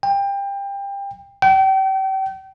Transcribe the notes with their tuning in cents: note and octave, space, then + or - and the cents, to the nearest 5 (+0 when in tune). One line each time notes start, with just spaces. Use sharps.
G5 +25
G5 -35